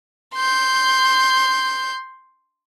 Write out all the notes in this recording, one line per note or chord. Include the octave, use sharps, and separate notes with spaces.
C6 G6